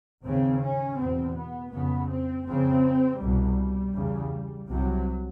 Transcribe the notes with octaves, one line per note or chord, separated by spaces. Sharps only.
D#2 C#3 C4
C#4
E2 B2 C4
B3
F2 C#3 B3
C4
F2 C#3 C4
C2 B2 G3
E2 C#3
C2 C3 F#3